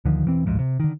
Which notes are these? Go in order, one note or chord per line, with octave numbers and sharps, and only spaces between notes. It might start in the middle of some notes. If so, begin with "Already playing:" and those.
D2 D3 D#3 F3
E1 E3 C4
A1 D2 G#2 F3
C3
D3 D#3